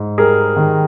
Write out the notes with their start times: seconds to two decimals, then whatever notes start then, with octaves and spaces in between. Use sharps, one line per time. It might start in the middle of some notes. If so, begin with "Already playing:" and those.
Already playing: G#2
0.18 G3 G#4 A#4
0.56 D#3